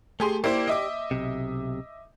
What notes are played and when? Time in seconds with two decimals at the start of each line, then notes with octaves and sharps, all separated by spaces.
0.20 A3 G4 G#4 C6
0.44 A#3 E4 G4 C5 D5
0.67 D#5 E5 D6
1.11 B1 C3